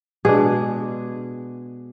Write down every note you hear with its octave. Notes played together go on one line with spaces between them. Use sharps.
B2 G#3 D4 G#4